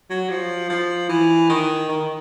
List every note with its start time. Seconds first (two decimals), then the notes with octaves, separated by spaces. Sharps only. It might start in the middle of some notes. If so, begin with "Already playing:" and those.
0.10 F#3
0.30 F3
0.70 F3
1.09 E3
1.50 D#3
1.89 D#3